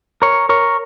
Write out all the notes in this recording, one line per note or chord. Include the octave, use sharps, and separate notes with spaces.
A#4 C#5
A#4 C#5